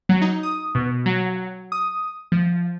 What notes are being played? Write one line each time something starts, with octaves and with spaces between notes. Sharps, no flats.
F#3
D#4
D#6
B2
F#3
D#6
F3